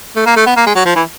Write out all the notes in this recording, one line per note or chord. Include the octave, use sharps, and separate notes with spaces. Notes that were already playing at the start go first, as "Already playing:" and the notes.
A3
A#3
A3
B3
A#3
G#3
F#3
F3
E3